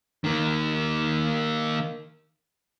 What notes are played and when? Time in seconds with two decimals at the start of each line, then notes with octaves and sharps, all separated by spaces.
0.24 D#3 A#3